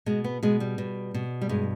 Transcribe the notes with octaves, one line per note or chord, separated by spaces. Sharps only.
B2 G#3
B3
B2 G#3
G3
B2
B2
G3
G2 G#3